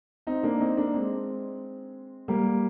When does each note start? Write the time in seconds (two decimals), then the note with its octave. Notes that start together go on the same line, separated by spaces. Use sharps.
0.27 C4 D#4
0.43 A#3 D4
0.60 C4 D#4
0.77 A#3 D4
0.94 G#3 C4
2.28 G3 A#3